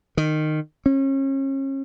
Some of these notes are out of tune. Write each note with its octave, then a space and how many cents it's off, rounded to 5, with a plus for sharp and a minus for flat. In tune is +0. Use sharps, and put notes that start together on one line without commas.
D#3 -15
C#4 -35